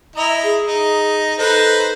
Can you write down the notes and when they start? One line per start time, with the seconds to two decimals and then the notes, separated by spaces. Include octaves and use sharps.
0.16 E4 D#5 A#5
0.44 G#4
0.67 D#4
1.38 D#4 A4 B4 C5